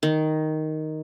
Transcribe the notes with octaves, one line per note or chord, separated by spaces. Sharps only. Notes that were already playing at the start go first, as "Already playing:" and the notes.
D#3